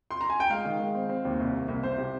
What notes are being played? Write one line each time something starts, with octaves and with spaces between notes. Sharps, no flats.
C6
A#5
G#5
G5
G#3 F5
D#3
G#3
C4
C4
D#2
C2
A#3
C2
C2 C5
C3